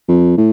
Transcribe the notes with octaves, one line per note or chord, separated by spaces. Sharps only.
F2
A2